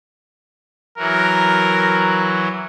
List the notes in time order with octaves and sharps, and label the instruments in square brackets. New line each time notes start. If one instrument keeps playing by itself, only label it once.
[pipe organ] E3 F#3 F#4 [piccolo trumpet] A#4